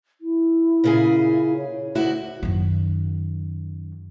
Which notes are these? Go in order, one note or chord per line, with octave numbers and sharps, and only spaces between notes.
E4
A#2 C#3 G#4
C#5
D2 E4 F#4
F#2 D#3